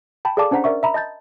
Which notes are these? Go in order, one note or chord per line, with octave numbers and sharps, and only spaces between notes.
G5 A5 B5
G#4 A4 D5 F5 A5 D6
C#4 D4 C5 F#5 A#5 B6
A#4 D5 E5 C#6
E5 A#5 B5
D#5 A5 G6 A6